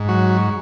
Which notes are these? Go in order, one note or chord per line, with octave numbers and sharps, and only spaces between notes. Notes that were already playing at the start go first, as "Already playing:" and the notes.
Already playing: G#2
F#3 F#4